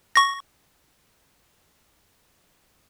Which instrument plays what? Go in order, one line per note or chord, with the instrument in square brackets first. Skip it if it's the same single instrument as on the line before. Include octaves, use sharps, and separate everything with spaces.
[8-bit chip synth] C#6 A#6